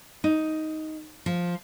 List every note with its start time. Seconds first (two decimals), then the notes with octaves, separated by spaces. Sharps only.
0.24 D#4
1.26 F3